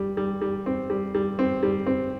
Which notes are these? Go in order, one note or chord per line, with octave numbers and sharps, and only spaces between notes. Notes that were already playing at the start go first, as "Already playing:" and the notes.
Already playing: G3
G3
G3
C4
G3
G3
C4
G3
C4